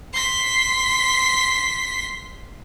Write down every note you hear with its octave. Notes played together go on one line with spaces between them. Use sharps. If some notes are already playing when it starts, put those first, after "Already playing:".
C6 B6